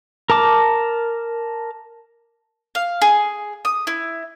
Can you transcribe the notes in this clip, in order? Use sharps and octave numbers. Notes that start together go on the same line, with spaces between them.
A#4 A5 D6
F5
G#4
D#6
E4